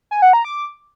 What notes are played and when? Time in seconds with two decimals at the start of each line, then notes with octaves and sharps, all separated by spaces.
0.11 G#5
0.22 F#5
0.33 A#5
0.45 D6